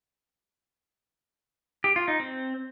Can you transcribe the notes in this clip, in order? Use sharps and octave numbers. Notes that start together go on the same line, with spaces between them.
G4
F4
D#4
C4